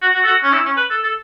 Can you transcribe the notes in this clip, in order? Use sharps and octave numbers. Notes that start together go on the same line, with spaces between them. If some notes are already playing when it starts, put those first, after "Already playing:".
F#4
F#4
A4
F#4
C#4
E4
C#4
B4
A4
A4